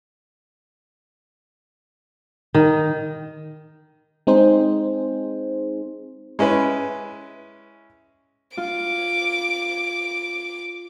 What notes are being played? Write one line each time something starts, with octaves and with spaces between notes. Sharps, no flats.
D#3
G#3 C4 D#4 G#4 C5
G#3 C#4 E4 B4
F4 D6